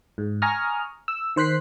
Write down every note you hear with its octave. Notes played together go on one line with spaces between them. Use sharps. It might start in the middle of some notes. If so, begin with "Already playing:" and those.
G#2
G#5 A#5 C#6 D#6 F6
E6
D#3 C5 F#6 B6 C7